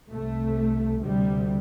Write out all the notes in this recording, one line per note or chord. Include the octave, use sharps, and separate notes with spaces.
C2 C3 A3
D2 C3 G3